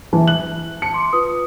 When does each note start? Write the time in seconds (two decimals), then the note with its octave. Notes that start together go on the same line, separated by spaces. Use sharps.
0.13 E3 E5 G#5 A5
0.28 F#6 F#7
0.82 A5 C#7
0.94 C6 D6
1.13 F4 B4 D#6